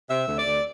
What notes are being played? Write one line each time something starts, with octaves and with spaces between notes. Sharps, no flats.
C3 E5
D2
D5
D2